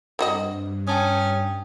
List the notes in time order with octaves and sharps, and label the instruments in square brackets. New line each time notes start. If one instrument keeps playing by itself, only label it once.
[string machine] G2 [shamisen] C4 F#4 D#5
[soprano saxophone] C#4 [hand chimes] G5 A5 D#6